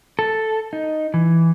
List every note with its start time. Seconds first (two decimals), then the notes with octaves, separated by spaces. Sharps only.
0.19 A4
0.73 D#4
1.14 E3